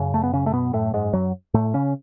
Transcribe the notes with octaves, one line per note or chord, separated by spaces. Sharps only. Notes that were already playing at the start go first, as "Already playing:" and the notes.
Already playing: F#2 C#3
A3
B3
C#3 C#4
A3
B2 B3
A2 A3
G#2 G#3
F#2 F#3
A2 A3
C#3 C#4